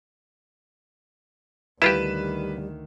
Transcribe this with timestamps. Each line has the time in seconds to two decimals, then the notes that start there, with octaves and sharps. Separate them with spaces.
1.82 D2 D#3 G3 E4 F4 G4 B4 E7